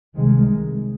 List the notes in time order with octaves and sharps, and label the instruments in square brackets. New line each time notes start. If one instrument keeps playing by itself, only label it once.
[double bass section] C2 C3 D#3 G#3